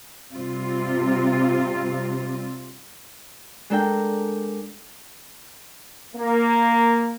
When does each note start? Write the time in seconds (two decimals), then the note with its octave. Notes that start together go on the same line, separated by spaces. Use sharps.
0.33 C3 G3 C4 F4
3.70 G#3 D4 A4 A#4 G5
6.16 A#3